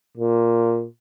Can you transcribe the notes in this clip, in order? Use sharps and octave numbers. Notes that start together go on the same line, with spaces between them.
A#2